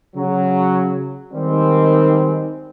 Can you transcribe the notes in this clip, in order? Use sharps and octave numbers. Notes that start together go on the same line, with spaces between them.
C#3 F#3
D#3 G3 G#3 C4